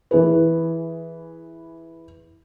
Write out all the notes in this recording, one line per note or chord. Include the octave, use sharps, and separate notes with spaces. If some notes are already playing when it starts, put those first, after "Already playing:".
E3 G#4 B4